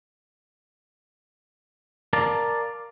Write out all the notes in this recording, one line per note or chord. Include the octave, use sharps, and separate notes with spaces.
A#4 D5 F5 A5